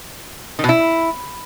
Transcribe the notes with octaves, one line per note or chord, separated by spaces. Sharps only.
D#3
B2
E4